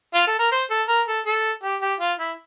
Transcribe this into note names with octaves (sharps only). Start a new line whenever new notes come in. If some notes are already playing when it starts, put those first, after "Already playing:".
F4
A4
A#4
C5
A4
A#4
A4
A4
G4
G4
F4
E4